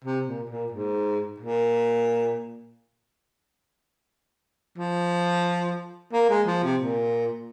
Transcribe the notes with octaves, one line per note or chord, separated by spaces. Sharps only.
C3
A#2
A#2
G#2
A#2
F3
A#3
G#3
F3
C3
A#2